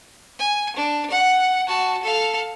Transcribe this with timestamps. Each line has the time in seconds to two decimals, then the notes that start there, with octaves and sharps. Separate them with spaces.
0.39 G#5
0.76 D4
1.11 F#5
1.67 F#4 A5
2.03 A4 F5